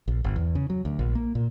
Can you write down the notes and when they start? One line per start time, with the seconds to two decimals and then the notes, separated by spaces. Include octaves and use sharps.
0.08 A#1
0.24 G1
0.36 E2
0.55 C#3
0.70 F#3
0.85 D2
0.99 A#1
1.15 A#3
1.35 A#2